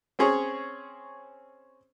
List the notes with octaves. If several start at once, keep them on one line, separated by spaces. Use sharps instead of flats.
C4 C#4 G#4 C#5